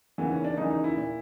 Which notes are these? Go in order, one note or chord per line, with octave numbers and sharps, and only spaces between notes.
D#2 C#3 E3 B3
C#4
D4
D#2 C#3 E3 D#4
D#4
E4
A#2